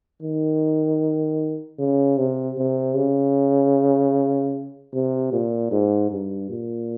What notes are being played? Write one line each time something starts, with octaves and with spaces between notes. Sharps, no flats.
D#3
C#3
C3
C3
C#3
C3
A#2
G#2
G2
A#2